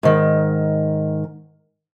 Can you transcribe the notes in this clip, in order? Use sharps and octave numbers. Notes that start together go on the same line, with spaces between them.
G#2 D#3